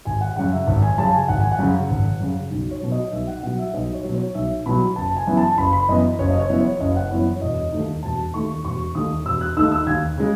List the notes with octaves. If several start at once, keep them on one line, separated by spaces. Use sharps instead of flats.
G#1 G#5
F#5
F#2 C#3 F#5
E5
G#1
G#5
F#2 C#3 A5
G#5
G#1 F#5
G#5
F#5
F#2 C#3
G#1
F#2 C#3
B1
C#5
B2 F#3
D#5
B1 E5
F#5
B2 F#3 F#5
E5
B1 D#5
C#5
B2 F#3
C#5
B1 E5
B2 F#3 B5
F#1 A5
G#5
F#2 E3 B3 E4
A5
F#1 B5
B5
F#2 E3 B3 E4 D#5
F#1 C#5
D#5
C#5
F#2 E3 B3 E4
C#5
F#1 D#5
F#5
F#2 E3 B3 E4 C#5
C#5
E1 D#5
D#2 D#3 A3 D#4
E1 A5
D#2 D#3 A3 D#4 C#6
E1 C#6
D#2 D#3 A3 D#4 D#6
E1 E6
F#6
D#2 D#3 A3 D#4 E6
E6
D#2 G#6
C#3 G#3